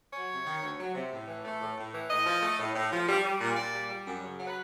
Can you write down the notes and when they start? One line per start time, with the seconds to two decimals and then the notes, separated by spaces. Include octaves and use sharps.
0.13 F#3 C#5
0.29 C3
0.46 D#3
0.62 D2
0.79 F#3
0.95 C3
1.11 A2
1.28 E3
1.44 A3
1.61 A2
1.77 A2
1.94 E3
2.09 A2 D#5
2.26 F3
2.43 A3
2.59 A2
2.76 A2
2.92 F3
3.08 G3
3.24 G3
3.41 A#2
3.57 A#2 D5
3.73 G3
3.90 G3
4.06 F#2
4.23 C#3
4.38 F#3
4.47 B4